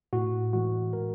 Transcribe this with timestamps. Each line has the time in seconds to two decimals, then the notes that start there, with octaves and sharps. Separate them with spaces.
0.13 A2 F#4
0.53 E3 G#3 F#4
0.93 A2 A#4